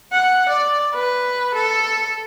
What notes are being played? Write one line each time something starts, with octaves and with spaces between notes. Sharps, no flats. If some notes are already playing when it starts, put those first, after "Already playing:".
F#5
D5
B4
A4